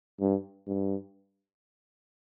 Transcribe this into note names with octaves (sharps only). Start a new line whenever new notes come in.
G2
G2